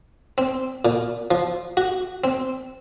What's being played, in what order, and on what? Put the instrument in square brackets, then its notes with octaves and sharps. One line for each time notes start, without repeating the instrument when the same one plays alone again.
[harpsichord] C4
A#2
F3
F#4
C4